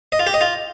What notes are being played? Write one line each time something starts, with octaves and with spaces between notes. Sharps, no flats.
D#5
F4
G4
D#5
F4